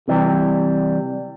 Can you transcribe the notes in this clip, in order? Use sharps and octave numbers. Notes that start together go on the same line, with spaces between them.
C3 E3 G3